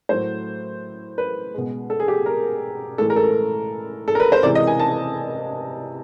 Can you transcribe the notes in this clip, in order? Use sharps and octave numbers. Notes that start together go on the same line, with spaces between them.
A2 F#3 A3 C5
B4
B2 G#3
A4
G#4
G4
A#4
A2 E3 G#3 A4
A#4
A4
A4
A#4
B4
C5
C3 E3 G#3 D5
D#5
G#5
A5